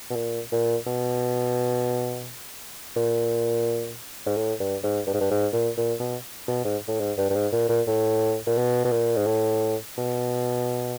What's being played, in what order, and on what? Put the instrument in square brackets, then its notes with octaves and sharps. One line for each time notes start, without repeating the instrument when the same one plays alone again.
[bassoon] B2
A#2
A#2
B2
A#2
G#2
A2
G2
G#2
G2
G#2
G2
G#2
A#2
A#2
B2
B2
G#2
A2
G#2
G2
G2
G#2
A#2
A#2
A2
A#2
B2
B2
A#2
G#2
A2
B2